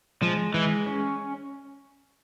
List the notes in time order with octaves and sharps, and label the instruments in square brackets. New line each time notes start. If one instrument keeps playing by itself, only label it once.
[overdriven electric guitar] F3 [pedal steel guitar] G#3
[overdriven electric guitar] E3 [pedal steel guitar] G#3
[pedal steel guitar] C#4